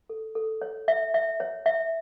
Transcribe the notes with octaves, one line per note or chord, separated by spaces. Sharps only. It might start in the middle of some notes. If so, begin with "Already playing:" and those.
A4
A4
C#5
E5
E5
C#5
E5